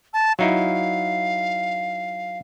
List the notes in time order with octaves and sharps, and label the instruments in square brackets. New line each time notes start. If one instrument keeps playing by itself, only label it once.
[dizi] A5
[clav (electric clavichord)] F#3 D#4 E4 [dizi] F5